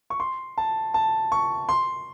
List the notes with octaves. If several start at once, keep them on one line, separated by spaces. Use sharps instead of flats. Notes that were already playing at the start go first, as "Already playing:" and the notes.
C#6
C6
A5
A5
C#6
C6